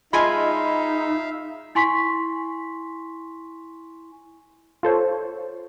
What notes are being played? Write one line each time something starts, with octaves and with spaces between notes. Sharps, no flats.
G#3 D#4 F4 E5 F5 G#5 B5
E4 G#5 C6 C#6 B6
F4 A4 C5 C#5